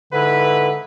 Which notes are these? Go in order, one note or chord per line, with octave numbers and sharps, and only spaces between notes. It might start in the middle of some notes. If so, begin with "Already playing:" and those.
G#2 D3 E4 B4